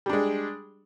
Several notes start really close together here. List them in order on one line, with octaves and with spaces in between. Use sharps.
G3 D4 G#3